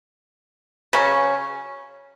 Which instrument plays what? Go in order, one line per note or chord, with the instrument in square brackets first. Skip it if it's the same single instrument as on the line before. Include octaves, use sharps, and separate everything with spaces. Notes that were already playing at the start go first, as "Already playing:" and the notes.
[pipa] C#3 F#3 C#4